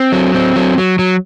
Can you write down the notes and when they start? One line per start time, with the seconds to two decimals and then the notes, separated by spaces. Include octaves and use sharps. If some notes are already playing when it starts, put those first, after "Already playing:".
Already playing: C4
0.12 F#3
0.35 C4
0.56 F#3
0.78 F#3
0.99 F#3